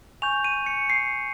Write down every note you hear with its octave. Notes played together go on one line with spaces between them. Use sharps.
G#5 C#6 G6 F7
D#7
C#7
C7